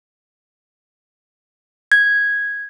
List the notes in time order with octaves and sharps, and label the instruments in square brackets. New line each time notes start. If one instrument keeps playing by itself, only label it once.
[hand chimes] G#6